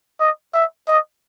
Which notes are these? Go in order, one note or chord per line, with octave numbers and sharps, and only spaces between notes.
D#5
E5
D#5